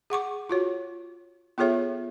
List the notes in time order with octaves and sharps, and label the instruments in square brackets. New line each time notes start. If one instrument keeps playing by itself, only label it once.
[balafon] G#4 F#5 C#6 D6
F4 F#4 C#5
B3 F4 G#4 A4 C#5 E5